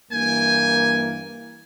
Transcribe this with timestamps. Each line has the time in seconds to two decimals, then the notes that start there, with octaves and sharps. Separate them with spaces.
0.11 G2 E3 A#3 G5 G#5